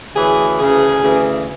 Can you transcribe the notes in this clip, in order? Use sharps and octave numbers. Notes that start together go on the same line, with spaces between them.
D2 C#3 E3 G#4
D2 C#3 E3 G#4
D2 C#3 E3